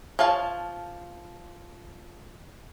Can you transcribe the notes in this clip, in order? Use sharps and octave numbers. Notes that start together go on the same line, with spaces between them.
F3 C#5 F5 A5